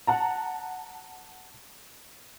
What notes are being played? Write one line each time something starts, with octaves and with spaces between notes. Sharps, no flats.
F#5 A5 A#5